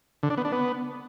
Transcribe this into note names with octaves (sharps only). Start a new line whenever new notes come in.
D3
D4
B3
D4
B3